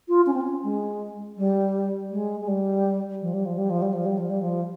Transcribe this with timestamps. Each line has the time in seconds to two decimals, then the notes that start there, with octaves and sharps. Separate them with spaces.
0.08 F4
0.26 C#4
0.34 C4
0.41 C#4
0.63 G#3
1.37 G3
2.11 G#3
2.40 G#3
2.48 G3
3.21 F3
3.34 G3
3.45 F3
3.58 G3
3.70 F3
3.82 G3
3.93 F3
4.05 G3
4.17 F3
4.29 G3
4.41 F3